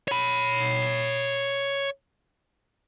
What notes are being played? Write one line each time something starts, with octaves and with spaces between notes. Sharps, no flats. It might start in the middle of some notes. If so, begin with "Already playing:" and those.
C#5 B5